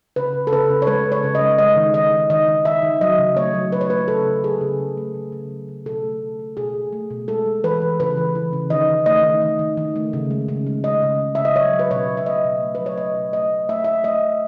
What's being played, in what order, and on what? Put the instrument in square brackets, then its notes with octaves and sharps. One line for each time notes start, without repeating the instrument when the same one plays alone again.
[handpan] C#3 B4
C#3
A4
C#3 B4
C#3
C#5
G#3 B4
C#3
C#5
C#3
D#5
G#3
G#3 D#5
D#3
D#3 D#5
D#3
D#3 D#5
D#3
D#3 E5
D#3
F#3 D#5
C#3
A3 C#5
F#3
F#3 B4
C#5
A3 B4
C#3 A4
C#3
F#3 G#4
C#3
C#3
A3
C#3
C#3
F#3
C#3
B2 A4
A3
B2
A3
B2 G#4
B2
A3
B2
G#3 A4
G#3
E3 B4
E3
C#3 B4
E3
E3
C#3
D#3 D#5
D#3
A3 D#5
D#3
D#3
D#3
D#3
A3
C#3
G#3
C#3
G#3
G#3 D#5
C#3
C#3
C#3 E5
D#5
F#3 C#5
F#3
B4
B2 C#5
B2
E5
A3 D#5
B2
A3
B4
F#3
C#5
A3 D#5
B2
A3 D#5
A3
A3 E5
A3 E5
A3 D#5
A3